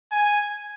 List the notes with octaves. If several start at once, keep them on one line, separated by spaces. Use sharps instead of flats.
G#5